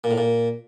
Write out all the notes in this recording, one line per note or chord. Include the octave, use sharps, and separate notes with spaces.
A#2
A2
A#2